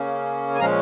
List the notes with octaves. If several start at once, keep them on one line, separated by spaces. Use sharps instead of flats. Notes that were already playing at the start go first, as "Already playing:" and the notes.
Already playing: C#3 A#3 C#4
G#5
A#2 F3 G#3 C#4 F5 A#5